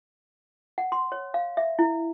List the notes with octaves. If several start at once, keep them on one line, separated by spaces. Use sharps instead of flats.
F#5
C6
C#5
F5
E5
E4